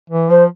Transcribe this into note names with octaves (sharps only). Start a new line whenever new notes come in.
E3
F3 C5